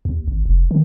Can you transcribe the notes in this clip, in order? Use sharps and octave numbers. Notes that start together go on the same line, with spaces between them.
D#2
G#1
F1
D#3